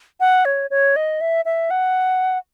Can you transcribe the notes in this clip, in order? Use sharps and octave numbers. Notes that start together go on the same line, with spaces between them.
F#5
C#5
C#5
D#5
E5
E5
F#5